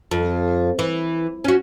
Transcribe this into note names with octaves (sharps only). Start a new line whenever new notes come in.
F2
E3
C#4 F#4